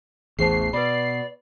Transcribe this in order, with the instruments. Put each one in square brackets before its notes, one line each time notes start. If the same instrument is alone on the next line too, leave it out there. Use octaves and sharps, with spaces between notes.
[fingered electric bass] A1 E2 [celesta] G#4 C5 A5 [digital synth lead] C7
[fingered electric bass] B2 [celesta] B4 B5 [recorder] D5